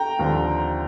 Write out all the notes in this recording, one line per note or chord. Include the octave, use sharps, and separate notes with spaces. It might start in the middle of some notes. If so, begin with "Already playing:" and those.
Already playing: G5 A#5
D#2 D3 F3 C4